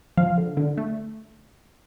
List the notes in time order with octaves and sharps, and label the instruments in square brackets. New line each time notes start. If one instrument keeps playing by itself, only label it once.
[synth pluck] F3 F5
D3
D3
A3